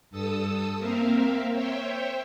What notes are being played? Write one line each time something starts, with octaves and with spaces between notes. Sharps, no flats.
G2 A4 A5 D#6 E6
A#3 C4 A#4 E5 F5
C5 C#5 E5 G5